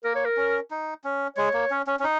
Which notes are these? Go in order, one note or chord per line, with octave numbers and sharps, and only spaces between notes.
A#3 A#4
C#5
A#4
C#4
D#4
C#4
G#3 C#5
A#3
C#4
C#4
C#4
D#4